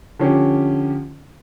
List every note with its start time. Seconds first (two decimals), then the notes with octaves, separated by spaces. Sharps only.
0.19 D3 F3 C#4 G4